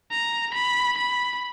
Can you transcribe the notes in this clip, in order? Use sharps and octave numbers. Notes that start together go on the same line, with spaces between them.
A#5
B5
B5